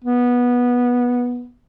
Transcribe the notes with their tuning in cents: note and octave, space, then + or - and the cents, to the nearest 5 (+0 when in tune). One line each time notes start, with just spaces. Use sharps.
B3 -15